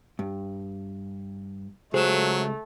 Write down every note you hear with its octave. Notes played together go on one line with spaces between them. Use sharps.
G2
C#2 F#3 A3 G#4 A4 C5 E7